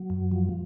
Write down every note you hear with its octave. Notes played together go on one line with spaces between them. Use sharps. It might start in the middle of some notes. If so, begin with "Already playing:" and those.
Already playing: F#3
F#2
F3